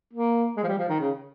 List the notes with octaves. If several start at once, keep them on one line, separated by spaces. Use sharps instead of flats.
A#3
G#3
F3
G3
F3
D#3
C#3